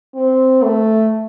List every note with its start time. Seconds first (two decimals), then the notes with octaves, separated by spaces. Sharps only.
0.15 C4
0.63 A3